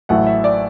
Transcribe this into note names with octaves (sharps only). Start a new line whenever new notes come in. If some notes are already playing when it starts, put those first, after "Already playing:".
A1 A2 F#3 A3 F#5
E5
D5